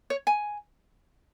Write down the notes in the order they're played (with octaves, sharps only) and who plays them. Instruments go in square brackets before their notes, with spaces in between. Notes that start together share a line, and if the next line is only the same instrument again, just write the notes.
[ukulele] C#5
G#5